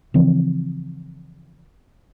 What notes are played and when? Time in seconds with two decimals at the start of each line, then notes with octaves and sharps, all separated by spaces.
0.14 C#3 E3 F3 C4